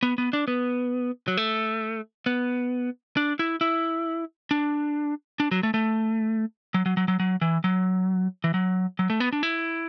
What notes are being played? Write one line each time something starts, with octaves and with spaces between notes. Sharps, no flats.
B3
B3
D4
B3
F#3
A3
B3
D4
E4
E4
D4
D4
F#3
A3
A3
F#3
F#3
F#3
F#3
F#3
E3
F#3
E3
F#3
F#3
A3
B3
D4
E4